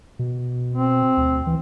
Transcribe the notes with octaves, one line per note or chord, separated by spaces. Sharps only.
B2
C4
D2
E3